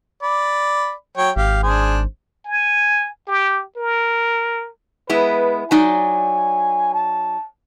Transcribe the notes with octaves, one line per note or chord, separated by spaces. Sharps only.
D5 B5
F#3 C#5 G5
G#1 G4 F5
D4 G#4 C5
G#5
G4
A#4
G#3 B3 E4 B4
F#3 D#4 D5 G#5
A5